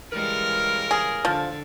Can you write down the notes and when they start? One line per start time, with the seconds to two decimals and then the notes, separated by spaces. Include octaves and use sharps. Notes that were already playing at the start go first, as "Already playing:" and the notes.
0.11 C#3 E3 G3 G#3 A#4
0.91 G#4
1.25 D3 F3